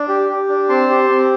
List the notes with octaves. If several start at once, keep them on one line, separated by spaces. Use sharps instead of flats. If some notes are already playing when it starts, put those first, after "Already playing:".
Already playing: D4
G4
G4
D4
C4 A5 C6
G4
C4